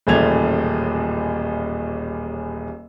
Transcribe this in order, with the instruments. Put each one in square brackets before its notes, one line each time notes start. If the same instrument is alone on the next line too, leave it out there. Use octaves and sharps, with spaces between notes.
[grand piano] D#1 A1 C#3 A3 G#6 F7